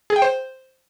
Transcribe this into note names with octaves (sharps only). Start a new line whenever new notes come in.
G#4
G5
C5